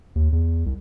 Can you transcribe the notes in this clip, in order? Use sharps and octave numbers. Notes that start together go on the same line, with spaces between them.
D#2
E2
C2